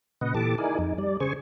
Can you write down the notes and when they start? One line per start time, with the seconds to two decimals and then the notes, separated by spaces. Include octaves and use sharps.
0.21 A#2 C#3 B4 D#5 F#5
0.35 A#2 E3 G4 A4 A5 D6
0.58 D#4 E4 G#4 A#4 D5 G#5
0.79 F2 D#4
0.98 G3 D5
1.20 C#3 G#4 C5 G#5 C#6